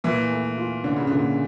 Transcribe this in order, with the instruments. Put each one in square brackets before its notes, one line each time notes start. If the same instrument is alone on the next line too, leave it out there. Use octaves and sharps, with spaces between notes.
[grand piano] A#2 [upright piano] E3
[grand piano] A3
F4
[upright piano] D3 [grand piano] C#4
[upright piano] C#3
[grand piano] A#2 [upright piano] D3